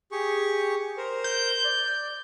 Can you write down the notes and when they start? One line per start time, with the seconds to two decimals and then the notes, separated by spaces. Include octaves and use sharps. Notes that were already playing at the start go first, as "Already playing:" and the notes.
0.12 G4 G#4 C#6
0.97 A#4 C5
1.24 G6
1.64 D5